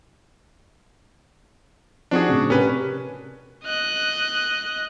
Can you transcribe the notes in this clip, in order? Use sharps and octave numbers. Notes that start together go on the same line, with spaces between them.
F3 C4 D4 D#4 F#4 G#4
A2 C#3
C3 C#4 G4 A#4 B4
D#5 F#6